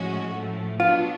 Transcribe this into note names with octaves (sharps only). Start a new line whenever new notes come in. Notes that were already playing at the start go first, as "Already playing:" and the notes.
Already playing: A2 F3 G#3 C#4 F#4
A2 F3 A3
B2 F#3 B3 D4 F4